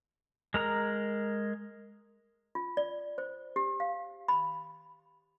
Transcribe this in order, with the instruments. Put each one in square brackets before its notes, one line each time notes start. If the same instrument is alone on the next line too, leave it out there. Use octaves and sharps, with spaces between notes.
[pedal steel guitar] G#3 A#4 A#5
[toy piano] F4
D5
C5
G4
F5
B5